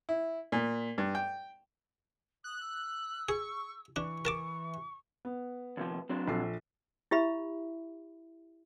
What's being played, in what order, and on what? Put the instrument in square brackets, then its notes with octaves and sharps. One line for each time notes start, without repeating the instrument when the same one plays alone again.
[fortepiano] E4
A#2
G2
G5
[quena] D#6 [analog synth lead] F#6
[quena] E6
[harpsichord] G#4 [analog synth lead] C#6
[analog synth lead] E3 [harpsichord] D4 [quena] C#6
[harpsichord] A#4 A5 D6
[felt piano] B3
[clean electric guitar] D#2 C3 F3
F#3 C4 D4
[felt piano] A#1 A4 C7
[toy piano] E4 G4 E5 B5